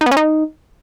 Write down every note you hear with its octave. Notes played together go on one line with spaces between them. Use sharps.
D#4
B3
C#4
D#4